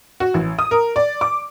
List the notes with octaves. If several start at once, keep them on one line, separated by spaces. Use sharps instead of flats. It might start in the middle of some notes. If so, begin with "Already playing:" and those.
F#4
A1
D#6
A#4
D5
D6